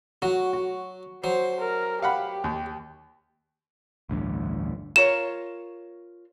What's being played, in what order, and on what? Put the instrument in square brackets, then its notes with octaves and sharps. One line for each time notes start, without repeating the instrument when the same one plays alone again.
[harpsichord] F#3 [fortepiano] F#4
[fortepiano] F#4
[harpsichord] F#3 [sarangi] C5
[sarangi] A#4
[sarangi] G4 [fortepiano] F5 F#5 B5
[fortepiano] D#2
[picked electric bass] A1 D2 G2
[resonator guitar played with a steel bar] F4 A#4 C#5 [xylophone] E7